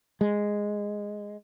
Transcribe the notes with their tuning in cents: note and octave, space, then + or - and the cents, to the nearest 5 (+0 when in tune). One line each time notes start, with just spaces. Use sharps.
G#3 -5